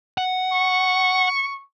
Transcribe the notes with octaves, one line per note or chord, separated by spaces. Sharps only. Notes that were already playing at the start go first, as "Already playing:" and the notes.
F#5
C#6